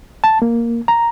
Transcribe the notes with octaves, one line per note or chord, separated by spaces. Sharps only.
A5
A#3
A#5